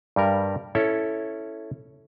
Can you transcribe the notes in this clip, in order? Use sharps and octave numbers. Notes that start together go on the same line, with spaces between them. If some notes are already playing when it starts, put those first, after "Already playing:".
G2 G3 A#4
C#4 E4 A4 C#5